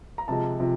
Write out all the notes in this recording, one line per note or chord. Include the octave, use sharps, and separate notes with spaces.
A#5
C3 F3 G#3 A5
C3 F3